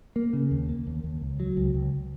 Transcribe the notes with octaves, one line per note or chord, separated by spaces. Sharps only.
A#3
C#3
D#2
A#3
D#2
D#2
C#2
F#3
C#2
C#2